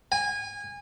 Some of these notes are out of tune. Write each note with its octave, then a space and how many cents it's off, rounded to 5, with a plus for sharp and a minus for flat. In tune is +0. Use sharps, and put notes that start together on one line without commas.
G#5 -25